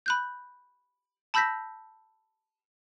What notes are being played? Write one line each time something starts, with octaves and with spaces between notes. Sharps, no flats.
B5 F#6 G6
A5 B5 E6 G6 A#6 B6